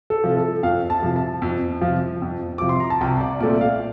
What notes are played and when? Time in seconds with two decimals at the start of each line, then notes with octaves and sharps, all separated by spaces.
0.10 A4
0.24 C3 F3
0.37 A4
0.63 F2 F5
0.90 A5
1.03 C3 F3
1.16 A5
1.42 F2
1.81 F3
1.87 C3
2.22 F2
2.58 C3 F3 D6
2.69 C6
2.80 A#5
2.90 A5
3.01 C2 G5
3.21 D5
3.40 A#2 A3 C4 D5
3.61 F5